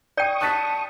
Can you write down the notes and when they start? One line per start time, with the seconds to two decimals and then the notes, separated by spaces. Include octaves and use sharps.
0.17 D5 G5 C#6 D#6 G6
0.41 A5 F#6 A6 B6